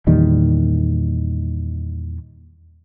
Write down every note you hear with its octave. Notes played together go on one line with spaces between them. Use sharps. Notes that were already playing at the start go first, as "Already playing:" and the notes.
E2 A#2 D#3 G3